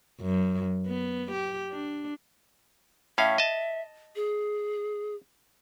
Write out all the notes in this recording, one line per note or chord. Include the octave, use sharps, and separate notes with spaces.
F#2
B3
G4
D4
A2 C#4 E5 F5
D#5 A5
G#4